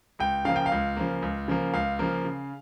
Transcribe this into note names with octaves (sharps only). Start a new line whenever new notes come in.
C#2 G5
C#3 F3 A#3 F5
G5
F5
C#2
C#3 F3 A#3
C#2
C#3 F3 A#3
C#2 F5
C#3 F3 A#3
C#3